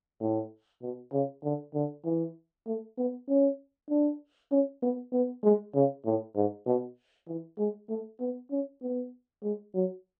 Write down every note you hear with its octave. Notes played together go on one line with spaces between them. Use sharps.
A2
B2
C#3
D3
D3
E3
A3
B3
C#4
D4
C#4
B3
B3
G#3
C#3
A2
G#2
B2
E3
G#3
A3
B3
C#4
B3
G#3
F#3